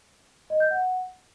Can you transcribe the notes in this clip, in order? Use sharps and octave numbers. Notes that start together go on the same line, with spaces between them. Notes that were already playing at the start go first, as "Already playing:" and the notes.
D#5
G6
F#5